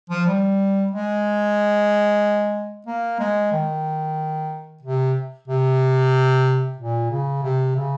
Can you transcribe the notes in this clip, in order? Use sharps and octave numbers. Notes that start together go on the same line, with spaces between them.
F3
G3
G#3
A#3
G#3
D#3
C3
C3
A#2
C#3
C3
C#3